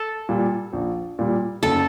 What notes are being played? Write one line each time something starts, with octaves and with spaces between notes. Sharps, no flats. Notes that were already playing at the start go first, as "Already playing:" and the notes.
Already playing: A4
A#2 G3
A#1
A#2 G3
F#1 A4